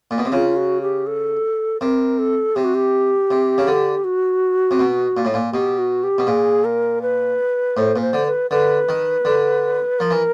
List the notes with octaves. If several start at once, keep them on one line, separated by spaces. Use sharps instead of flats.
A#2
B2
C3
C#3 F4
F#4
G4
A4
C3 A#4
A4
C3 G4
F#4
G4
C3
C#3
D3
F#4
C3
B2
A#2
A2
A#2
B2 G4
F#4
G4
B2
A#2 G#4
A#4
B4
A2 C5
A#2 B4
C5
D3
B4
D3 B4
D#3
D3
F3 A#4
E3